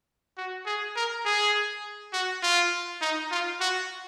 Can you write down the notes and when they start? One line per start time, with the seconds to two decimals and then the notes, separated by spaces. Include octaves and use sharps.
0.38 F#4
0.66 G#4
0.96 A#4
1.25 G#4
2.13 F#4
2.43 F4
3.01 D#4
3.31 F4
3.60 F#4